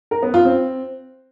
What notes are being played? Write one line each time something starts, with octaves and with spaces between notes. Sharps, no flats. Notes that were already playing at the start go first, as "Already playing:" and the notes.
A#4
B3
F4
C4